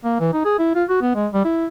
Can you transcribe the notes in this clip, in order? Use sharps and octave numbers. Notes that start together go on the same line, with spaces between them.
A#3
E3
D#4
G#4
E4
F4
F#4
B3
G#3
G3
E4